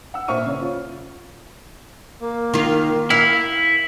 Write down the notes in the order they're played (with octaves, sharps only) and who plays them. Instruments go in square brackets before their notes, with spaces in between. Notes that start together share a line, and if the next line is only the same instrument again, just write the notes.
[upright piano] F#5 E6
A#2 C5 E5 C#6 F6 D#7
C#3 C#5
F4
[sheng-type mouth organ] A#3
[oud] D#3 F4
[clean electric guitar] E4 [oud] F5